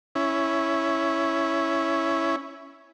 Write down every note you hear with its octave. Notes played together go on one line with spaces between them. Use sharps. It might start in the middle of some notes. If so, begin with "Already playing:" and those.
C#4 E4